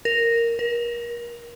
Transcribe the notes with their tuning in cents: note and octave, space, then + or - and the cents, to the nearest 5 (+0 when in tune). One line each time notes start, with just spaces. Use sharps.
A#4 -5
A#4 +30